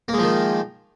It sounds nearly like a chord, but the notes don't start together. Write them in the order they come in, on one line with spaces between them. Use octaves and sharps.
A#3 G#3 F3 D#3